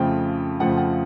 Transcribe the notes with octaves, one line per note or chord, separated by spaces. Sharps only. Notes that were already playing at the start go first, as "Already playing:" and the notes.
Already playing: F2 C#3 F3 A3 G5
F2 C#3 F3 A3 F#5
F#5